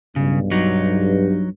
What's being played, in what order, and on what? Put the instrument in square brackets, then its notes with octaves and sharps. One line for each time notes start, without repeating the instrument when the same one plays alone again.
[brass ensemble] B1 G2 [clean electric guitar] C#3
[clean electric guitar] F#3 D#4